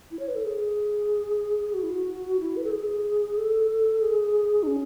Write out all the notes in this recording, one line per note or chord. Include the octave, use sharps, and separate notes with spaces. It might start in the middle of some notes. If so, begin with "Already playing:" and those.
E4
C#5
B4
A4
G#4
F#4
E4
F#4
E4
B4
A4
G#4
A4
G#4
D#4
C#4